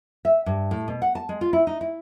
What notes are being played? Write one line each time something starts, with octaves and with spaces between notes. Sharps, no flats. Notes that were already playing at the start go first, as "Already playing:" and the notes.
E5
G2
A2
B2
F#5
A5
G#3
F4
E4
D#4
E4